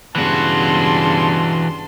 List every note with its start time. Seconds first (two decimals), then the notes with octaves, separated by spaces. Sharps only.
0.16 G2 C#3 E3 B3 F#4 A5 C6